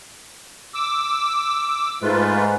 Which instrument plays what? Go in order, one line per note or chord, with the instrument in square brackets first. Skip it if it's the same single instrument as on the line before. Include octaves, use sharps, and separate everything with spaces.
[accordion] D6 E6
[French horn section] G#2 [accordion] A3 F4 B4